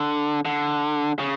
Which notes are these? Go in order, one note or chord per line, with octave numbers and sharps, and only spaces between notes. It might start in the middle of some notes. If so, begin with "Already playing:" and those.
Already playing: D3
D3
C#3